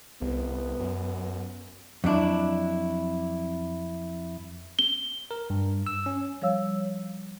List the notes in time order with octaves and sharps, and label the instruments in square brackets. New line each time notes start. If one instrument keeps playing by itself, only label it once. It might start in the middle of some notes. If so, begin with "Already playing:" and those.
[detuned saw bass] C2 [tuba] B3
[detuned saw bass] F#2
[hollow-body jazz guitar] F2 F#3 D4 E4
[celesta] G7
[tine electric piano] A#4
G2
E6
C#4
[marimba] F3 G3 C#5 F5 E6